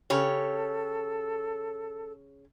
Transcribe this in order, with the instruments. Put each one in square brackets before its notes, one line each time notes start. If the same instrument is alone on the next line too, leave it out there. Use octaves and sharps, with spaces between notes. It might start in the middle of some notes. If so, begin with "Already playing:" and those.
[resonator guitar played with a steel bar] C#3 G4 C#5 [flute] A4